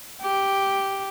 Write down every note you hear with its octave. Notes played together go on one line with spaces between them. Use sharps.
G4